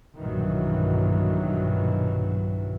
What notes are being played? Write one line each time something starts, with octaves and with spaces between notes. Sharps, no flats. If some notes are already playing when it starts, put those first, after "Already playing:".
B1 G2 A#2 D#3 E3 F#3